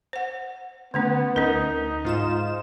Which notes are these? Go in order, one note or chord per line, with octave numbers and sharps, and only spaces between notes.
C5 F#5
D3 A3 B3 C#4
D2 C#4 D#4 A#4
G#2 F4 E7